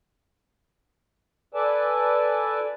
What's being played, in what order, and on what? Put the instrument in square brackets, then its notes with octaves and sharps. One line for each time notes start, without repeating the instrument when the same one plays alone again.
[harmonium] A4 B4 D5 G#5 A5